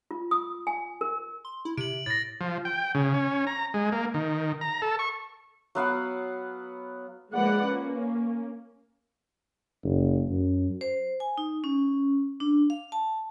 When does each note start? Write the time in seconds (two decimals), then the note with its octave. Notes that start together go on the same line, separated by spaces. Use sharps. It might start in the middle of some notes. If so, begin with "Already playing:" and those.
0.11 F4
0.31 D#6
0.67 G#5
1.01 A#4
1.45 C6
1.65 E4
1.78 C3 D7 F#7
2.06 A2 A6 A#6
2.41 F3
2.65 G5
2.95 C#3
3.14 C#4
3.47 A#5
3.74 G#3
3.92 A#3
4.14 D#3
4.61 A#5
4.82 A4
4.99 C#6
5.75 F#3 B3 F5 F#5
7.34 F3 G#3 A#3 B4 D5 F#5
7.67 A#3 C#4
9.84 F#1
10.30 F#2
10.81 C5
11.20 G#5
11.38 D#4
11.64 C#4
12.40 D4
12.70 F5
12.92 A5